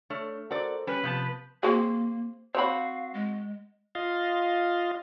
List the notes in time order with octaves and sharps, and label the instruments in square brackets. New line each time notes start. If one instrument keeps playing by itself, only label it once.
[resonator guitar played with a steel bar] A3 [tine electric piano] D4 C#5 F6
[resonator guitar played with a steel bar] F#4 D5 [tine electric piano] A4 A#4 C5
[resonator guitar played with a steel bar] G3 [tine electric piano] C#4 [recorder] B4
[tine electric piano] C3 G6 [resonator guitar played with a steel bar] F3 B3 A5
[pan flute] A#3 [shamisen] C4 F#4 G#4
[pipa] C4 F#4 [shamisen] C5 C#5 B5 [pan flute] F5
[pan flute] G#3
[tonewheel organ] F4 D#5 F5